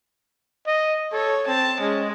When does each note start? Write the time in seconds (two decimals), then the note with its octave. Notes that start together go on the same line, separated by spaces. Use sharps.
0.67 D#5
1.12 A4 C#5
1.47 C4 A5
1.80 G#3 C#4